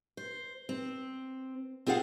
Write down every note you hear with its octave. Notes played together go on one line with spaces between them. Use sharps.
C5
C4
C4 F4 G#4 F5 F#5